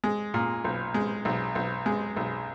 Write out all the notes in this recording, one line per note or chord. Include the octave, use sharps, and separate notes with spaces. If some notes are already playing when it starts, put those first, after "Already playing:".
G#3
A#2
B1
G#3
B1
B1
G#3
B1